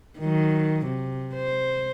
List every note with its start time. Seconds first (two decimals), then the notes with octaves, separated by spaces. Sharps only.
0.19 D#3 F#3
0.86 C3
1.34 C5